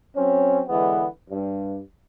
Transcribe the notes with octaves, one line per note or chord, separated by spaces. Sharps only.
F#3 C4 C#4
D3 E3 G#3 B3
G2